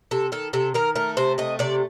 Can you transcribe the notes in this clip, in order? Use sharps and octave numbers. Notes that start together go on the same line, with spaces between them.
C3 A4
D#3 A4
C3 A4
D#3 A#4
A3 A#4
C3 C5
A3 D#5
C3 D5